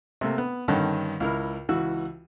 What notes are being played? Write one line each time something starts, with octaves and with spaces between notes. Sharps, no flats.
C3 A3 A#3
B3
G2 D3 D#3 C#4 A5 F#6
C#2 E4 A#4 F6
C#2 E3 F#4 E6